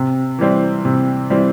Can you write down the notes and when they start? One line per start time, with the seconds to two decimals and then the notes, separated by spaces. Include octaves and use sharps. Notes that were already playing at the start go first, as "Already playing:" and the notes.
Already playing: C3
0.39 E3 G3 C4
0.85 C3
1.30 E3 G3 C4